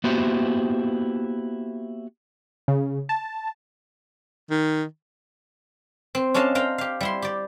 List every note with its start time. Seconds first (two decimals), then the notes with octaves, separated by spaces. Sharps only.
0.04 A#3 B3 E4 F#4 G4 C5
2.68 C#3
3.09 A5
4.50 D#3
6.15 C4
6.34 C#4 D4 A4 D#5 F5 A5
6.55 C5 F5 G5 A#5
6.78 G4 F5
7.01 G3 E4 C6
7.22 G4 D5